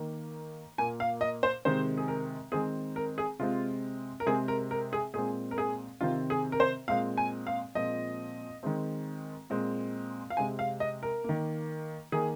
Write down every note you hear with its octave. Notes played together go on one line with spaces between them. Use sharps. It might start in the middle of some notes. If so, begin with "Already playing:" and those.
Already playing: D#3 A#3
A#2 A#3 G#5
F5
D#5
C5
C3 D#3 G#3 C4 C5
G#4
A#4
D#3 G#3 C4 G#4
A#4
G#4
C3 G#3 C4 F4
A#4
C3 G#3 C4 G#4
A#4
A#4
G#4
A#2 G#3 C4 G#4
A#4
G#4
C3 D#3 C4 F4
G#4
A#4
C5
A#2 G#3 C4 F5
G#5
F5
A#2 F3 G#3 C4 D#5
D#3 G#3 C4
A#2 G#3 C4
F5
C3 G#3 C4 G#5
F5
D#5
A#4
D#3 A#3
D#3 A#3 G#4